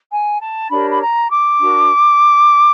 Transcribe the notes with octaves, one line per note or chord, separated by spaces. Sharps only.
G#5
A5
D4 G4 A#4 C#5 B5
B5
A#5
D6
D4 F#4 A#4